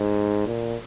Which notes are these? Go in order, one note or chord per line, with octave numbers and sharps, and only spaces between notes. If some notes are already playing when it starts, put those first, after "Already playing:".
Already playing: G#2
A#2